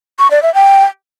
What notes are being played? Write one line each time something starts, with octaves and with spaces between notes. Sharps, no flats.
C#6
D5
E5
G5